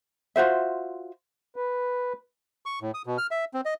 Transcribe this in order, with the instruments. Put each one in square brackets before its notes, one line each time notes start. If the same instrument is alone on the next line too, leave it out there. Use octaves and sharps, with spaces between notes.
[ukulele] F4 F#4 C5 E5
[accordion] B4
[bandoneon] C#6
A2
D#6
B2
F6
E5
C4
D#5